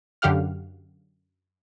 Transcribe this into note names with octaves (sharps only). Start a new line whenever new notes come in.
F#2 D3 G4 F5 F#5 F6